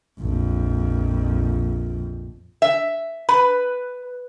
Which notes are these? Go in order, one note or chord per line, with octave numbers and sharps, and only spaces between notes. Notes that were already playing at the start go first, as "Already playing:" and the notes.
A#1 F2
E5
B4